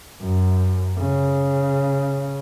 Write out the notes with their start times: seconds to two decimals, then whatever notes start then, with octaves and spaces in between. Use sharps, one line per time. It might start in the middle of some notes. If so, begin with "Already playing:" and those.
0.22 F#2
0.98 C#3